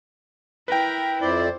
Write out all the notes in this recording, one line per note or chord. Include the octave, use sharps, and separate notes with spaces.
E4 A#4 B4 G5
F2 E4 C5 D5